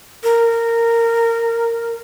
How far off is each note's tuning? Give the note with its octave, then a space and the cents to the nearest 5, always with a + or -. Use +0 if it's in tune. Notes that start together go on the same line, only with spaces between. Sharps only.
A#4 -15